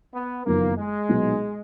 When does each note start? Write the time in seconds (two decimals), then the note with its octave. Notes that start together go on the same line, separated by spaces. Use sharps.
0.14 B3
0.46 F#1 F2 D#3 F#3 A#3 B3
0.77 G#3
1.09 B1 A#2 F#3 B3 D#4